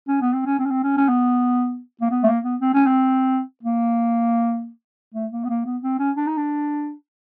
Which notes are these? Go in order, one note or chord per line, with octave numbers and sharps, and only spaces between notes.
C#4
B3
C4
C#4
C4
C#4
C4
C#4
C#4
B3
A#3
B3
A3
A#3
B3
C4
C#4
C4
A#3
A3
A#3
B3
A#3
B3
C4
C#4
D4
D#4
D4